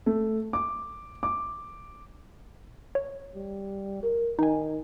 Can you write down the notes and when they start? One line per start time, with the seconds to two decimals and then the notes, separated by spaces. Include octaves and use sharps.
0.06 A3
0.53 D6
1.23 D6
2.95 C#5
3.35 G3
4.03 A#4
4.39 D#3 D#4 G#5